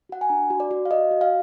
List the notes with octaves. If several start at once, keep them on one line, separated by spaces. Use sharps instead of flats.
F#4 F#5
G#5
D4 A#5
F#4
D5
F#4
F5
F#4 D#5
F#4
F5